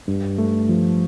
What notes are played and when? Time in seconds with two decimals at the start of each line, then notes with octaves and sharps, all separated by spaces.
0.08 G2
0.38 A3
0.69 F3